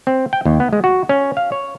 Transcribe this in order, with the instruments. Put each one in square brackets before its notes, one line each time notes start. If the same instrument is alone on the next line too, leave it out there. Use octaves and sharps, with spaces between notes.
[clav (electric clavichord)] C4
G5
D#2
B3
G#3
F#4
C#4
F5
C#5